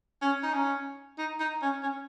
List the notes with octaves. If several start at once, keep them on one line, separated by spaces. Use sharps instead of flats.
C#4
D#4
C#4
D#4
D#4
C#4
C#4